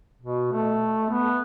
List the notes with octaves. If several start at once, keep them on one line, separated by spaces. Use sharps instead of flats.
B2
A3
B3